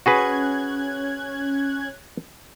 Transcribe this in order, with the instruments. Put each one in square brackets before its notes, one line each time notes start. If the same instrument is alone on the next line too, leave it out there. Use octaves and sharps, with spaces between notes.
[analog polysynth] C#4 F#6 G#6 [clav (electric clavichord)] F#4 G#4 B4